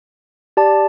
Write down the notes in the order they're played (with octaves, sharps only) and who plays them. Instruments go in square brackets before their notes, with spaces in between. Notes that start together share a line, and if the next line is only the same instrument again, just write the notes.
[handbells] G4 D5 A5